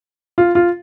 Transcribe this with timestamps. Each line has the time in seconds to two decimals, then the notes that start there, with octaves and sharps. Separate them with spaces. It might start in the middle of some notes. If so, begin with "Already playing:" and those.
0.38 F4
0.55 F4